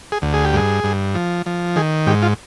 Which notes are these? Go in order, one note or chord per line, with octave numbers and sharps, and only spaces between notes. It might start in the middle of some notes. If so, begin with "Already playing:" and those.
G#4
D2
G#4
G4
G2 G#4
G2
F3
F3
D#3 G#4
G#2 G4
F4